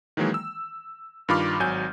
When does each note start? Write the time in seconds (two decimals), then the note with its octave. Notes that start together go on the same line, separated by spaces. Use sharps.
0.17 D#3 E3 F#3 G#3 A#3
0.34 E6
1.29 G2 D#3 F4 B5 D6 F6
1.60 G#1 F#3 G#5 G6